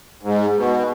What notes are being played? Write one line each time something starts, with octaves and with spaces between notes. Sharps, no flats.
G#2
B2